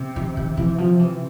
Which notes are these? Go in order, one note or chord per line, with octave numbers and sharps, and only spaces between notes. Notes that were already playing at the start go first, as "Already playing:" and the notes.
Already playing: C3
D#3
D#3
E3
F3
E3